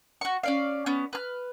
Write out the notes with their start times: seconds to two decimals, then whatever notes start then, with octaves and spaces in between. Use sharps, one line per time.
0.21 F#4 C#6
0.43 C#4 D5 F5
0.86 B3 C#4
1.13 B4 F6